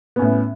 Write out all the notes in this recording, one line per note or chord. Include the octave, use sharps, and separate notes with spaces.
A2 B3 C#4